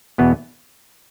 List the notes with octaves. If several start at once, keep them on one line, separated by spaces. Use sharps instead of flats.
E2 B2 B3